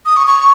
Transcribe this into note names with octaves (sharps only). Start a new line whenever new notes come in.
D#6
C#6
C#6